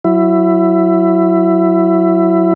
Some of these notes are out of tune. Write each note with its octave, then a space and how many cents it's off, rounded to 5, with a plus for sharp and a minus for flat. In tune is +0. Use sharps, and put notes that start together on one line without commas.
F#3 +0 E4 +15